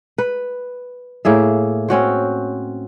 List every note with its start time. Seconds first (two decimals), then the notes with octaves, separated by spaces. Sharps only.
0.18 B4
1.25 A2 A#3 G#4 E5
1.88 C4 C#4 F#4 C5